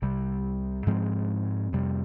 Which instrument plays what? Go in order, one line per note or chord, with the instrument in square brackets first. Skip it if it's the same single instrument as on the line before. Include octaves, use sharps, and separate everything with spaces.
[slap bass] C2 C3 G3
G#2 F3 G#3 C4
F2 C3 G3